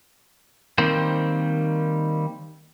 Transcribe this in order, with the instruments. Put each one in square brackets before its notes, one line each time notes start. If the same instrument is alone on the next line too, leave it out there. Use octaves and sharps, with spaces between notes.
[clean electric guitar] D#3 G3 A#3 C4 C5